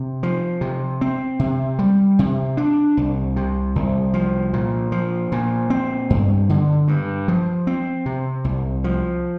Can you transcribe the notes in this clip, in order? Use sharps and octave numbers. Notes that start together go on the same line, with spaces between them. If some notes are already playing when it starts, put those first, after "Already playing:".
Already playing: C3
F3
C3
C4
C3
G3
C3
D4
C2
C3
C2
F3
A#2
F3
A#2
C4
G2
D3
G2
F3
C4
C3
C2
F3